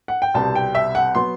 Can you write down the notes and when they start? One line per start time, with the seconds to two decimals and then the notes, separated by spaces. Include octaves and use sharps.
0.08 F#5
0.22 G5
0.34 C2 B2 G3 C4 A5
0.55 G5
0.75 E5
0.95 F#5
1.15 F#3 B3 C6